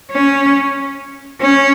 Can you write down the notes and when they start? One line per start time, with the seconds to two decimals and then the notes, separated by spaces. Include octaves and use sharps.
0.11 C#4
1.41 C#4